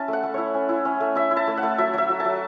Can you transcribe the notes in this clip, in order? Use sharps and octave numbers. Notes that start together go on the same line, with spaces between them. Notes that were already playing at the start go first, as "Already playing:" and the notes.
Already playing: C#4 E4 A5 B5
A3
F#5
A3
E4 C#5
C#4
E4
C#4
A3
E4 E5
E4
A5
A3
F#5
A3
F#3 E5
F#3 E5
F#3
A5
F#3